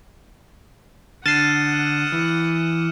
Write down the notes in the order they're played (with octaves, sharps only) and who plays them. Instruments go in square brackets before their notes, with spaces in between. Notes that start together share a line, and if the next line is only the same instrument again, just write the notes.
[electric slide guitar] D3 [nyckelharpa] F#5 D#6 [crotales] F6 D#7 E7 [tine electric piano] A6 C7
[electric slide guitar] E3